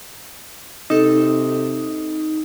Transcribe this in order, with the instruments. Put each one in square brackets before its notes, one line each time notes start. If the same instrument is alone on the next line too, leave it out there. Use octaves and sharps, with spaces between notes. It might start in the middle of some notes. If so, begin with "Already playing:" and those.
[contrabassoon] C3 [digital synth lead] D#4 [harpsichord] A4